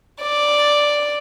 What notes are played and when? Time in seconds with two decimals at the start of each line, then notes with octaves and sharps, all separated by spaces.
0.22 D5